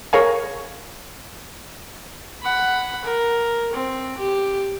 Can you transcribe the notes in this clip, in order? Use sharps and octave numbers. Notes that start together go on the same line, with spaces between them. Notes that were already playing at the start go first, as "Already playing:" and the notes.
G#4 A#4 C#5 F5 G#5
F#5 B5
A#4
C4
G4